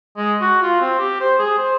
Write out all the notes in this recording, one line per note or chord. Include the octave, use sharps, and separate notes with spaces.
G#3
F#4
F4
C4
G4
C5
G#4
C5